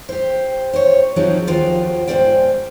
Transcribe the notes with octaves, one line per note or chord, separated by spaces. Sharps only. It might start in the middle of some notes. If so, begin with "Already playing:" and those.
G4 C5
C5 C#5
F3 F#3 C4 C#4 D#4 G#4
D#2 F3 F4 F#4 C5 G5
G#2 G3 C#4 C5 D5 G5